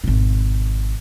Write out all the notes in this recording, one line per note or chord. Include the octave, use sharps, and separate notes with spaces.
G#1 B2